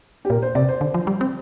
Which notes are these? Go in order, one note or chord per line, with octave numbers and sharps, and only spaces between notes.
G4
A#2 A#4
C5
C3 D5
C5
D3
F3
G3
C4